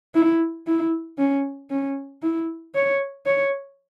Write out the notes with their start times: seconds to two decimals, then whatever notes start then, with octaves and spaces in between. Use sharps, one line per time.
0.15 E4
0.67 E4
1.18 C#4
1.70 C#4
2.23 E4
2.75 C#5
3.26 C#5